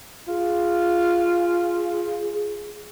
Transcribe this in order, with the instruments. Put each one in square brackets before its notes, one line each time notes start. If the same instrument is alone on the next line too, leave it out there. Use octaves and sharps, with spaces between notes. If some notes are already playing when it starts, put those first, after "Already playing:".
[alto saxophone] F4 [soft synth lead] G#4